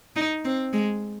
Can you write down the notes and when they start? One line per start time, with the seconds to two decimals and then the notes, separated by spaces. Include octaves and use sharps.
0.16 D#4
0.45 C4
0.73 G#3